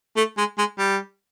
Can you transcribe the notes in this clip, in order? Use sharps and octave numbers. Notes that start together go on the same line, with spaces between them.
A3
G#3
G#3
G3